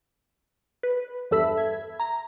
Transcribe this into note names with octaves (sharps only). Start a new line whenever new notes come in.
B4
E2 G2 A4 E5 B5 B6
G#6
A#5 A#6